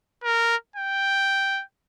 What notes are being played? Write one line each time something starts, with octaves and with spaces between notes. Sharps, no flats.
A#4
G5